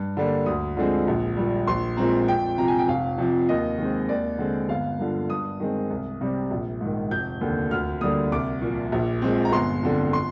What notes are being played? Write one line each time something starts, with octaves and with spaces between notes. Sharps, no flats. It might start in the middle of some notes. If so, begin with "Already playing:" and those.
Already playing: G2
D3 G3 A#3
D2 D#6
D3 F3 G#3 C4
A#1
A#2 G3
A#1 C6
A#2 G#3 C4 A#5
F2 G5
C3 F3 A#5
G#5
G5
F1 F5
F2 C3 F3
D#2 D#5
D#3 G#3 C4
D#2 D5
D3 G#3 C4
G1 F5
G2 D3 F3
G2 D#6
D#3 G#3 C4
C2
C3 G3 C4
A#1
G#2 D#3
F1 G6
D#2 D3
D2 F6
D3 G3 A#3 D#6
C2 D6
A#2 F3
A#1
A#2 G#3 C4
A#5
G1 C6
F2 D3
C6